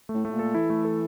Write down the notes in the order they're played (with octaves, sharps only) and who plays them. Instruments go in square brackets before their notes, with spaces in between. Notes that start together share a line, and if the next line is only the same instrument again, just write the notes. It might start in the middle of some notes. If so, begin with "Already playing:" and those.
[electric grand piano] A3
[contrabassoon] A2
[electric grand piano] A3
[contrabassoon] A2
[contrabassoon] A#2 [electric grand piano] A4
[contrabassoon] E3 [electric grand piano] E4
[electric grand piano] A3
A4